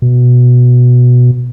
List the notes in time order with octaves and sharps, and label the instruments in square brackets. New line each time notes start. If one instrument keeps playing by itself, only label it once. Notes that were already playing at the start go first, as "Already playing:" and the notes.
[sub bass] B2